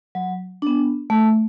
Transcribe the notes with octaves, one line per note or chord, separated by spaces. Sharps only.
F#3
B3 D4
A3